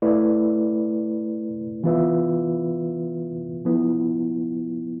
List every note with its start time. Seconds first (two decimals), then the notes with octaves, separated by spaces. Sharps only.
0.02 A3 E4 B4 D5
1.84 E3 B3 F4 B4 E5
3.65 F3 B3 E4